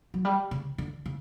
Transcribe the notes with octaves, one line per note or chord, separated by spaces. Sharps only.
F#3
G3
C#3
D3
C#3